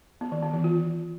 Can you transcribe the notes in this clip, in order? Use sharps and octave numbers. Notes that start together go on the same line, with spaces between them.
B3
D#3
B3
E3
F4